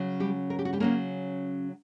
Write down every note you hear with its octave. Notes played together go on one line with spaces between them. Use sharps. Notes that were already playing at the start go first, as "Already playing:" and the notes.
Already playing: C#3 F#3 C#4
G3 G4
A#4
G4
F#4
G3 G4
C#3 F#3 A#3 C#4 A#4